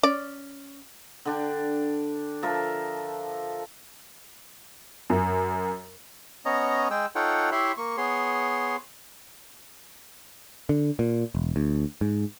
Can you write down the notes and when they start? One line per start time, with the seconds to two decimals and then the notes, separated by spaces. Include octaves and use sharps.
0.03 C#4 D5
1.25 D3 D4 G5
2.43 F3 A4 A#4 E5
5.10 F#2
6.46 B3 C#4 C#5 D#5 A#5
6.91 G#3 G#4 G5 E6
7.15 D#4 F4 A4 C#5 F#5 G5
7.52 E4 G4 C#5 E5 B5 C6
7.78 A#3 C#6
7.97 B3 G#4 C#5 C6
10.69 D3
10.99 A#2
11.35 E1
11.56 D2
12.01 G#2